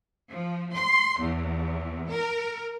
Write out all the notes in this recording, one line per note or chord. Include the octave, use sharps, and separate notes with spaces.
F3
C6
E2
A#4